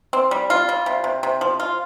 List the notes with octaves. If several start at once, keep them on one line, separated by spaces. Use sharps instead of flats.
C4
G3
F4
G3
C3
C3
C3
F3
F4